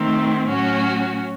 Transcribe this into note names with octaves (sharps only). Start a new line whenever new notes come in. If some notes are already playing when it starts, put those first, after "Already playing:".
Already playing: D#3 A3 C4
A2 F#3 C#4 F#4